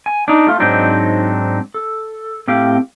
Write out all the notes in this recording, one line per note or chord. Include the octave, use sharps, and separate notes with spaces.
G#5
D4 D#4
A3 F4
G#2 F#3 C4 D4 D#4
A4
A2 C4 G4 F5